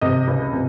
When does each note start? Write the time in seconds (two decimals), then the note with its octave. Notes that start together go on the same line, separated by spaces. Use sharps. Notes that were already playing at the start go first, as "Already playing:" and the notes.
0.01 C3 D#5
0.28 C#2
0.53 C3